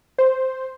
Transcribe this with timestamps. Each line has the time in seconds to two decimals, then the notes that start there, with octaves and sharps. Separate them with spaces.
0.18 C5